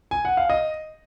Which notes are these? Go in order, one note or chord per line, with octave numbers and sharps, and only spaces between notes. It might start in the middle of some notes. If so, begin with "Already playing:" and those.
G#5
F#5
F5
D#5